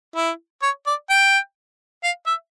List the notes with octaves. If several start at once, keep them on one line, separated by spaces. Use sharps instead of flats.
E4
C#5
D5
G5
F5
E5